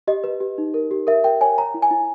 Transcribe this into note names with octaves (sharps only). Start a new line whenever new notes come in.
G4 D#5
B4
G4
D#4
A#4
G4
A#4 E5
A#4 G5
C#5 G#5
C#5 A#5
E4
G#5
E4